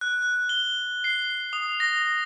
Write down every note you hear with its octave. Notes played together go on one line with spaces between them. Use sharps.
F#6
F#6
G7
C7
D#6
A#6